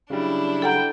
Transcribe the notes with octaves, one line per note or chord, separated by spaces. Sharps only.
C#3 F#3 G3 D4 E4
A4 F#5 G5 A#5